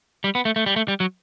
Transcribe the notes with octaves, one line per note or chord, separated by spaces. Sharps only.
G3
B3
A3
A3
G3
A3
G3
F#3